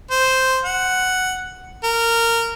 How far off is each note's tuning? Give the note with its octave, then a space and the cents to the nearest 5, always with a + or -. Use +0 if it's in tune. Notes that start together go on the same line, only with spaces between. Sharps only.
C5 -5
F#5 +5
A#4 -15